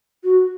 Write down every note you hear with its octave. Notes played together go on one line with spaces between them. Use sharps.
F#4